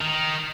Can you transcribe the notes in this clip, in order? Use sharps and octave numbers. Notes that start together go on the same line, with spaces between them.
D#3